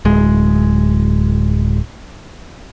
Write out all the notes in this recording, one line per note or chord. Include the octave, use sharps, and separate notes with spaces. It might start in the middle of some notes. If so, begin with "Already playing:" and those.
D1 G#3